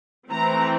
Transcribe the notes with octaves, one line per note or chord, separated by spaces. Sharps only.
E3 A3 C4 A#5